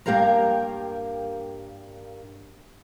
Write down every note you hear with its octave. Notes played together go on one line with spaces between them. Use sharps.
G2 A#3 G4 A#4 F5 A#5